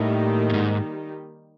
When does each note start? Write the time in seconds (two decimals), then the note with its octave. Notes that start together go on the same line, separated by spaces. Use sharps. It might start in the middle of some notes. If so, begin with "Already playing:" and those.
Already playing: A2 D#3 G3 A#3 D#4 G4
0.50 G2
0.54 G#2